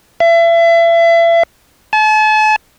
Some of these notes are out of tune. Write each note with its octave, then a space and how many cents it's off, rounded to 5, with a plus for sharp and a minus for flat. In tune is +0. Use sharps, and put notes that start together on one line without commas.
E5 +35
A5 -40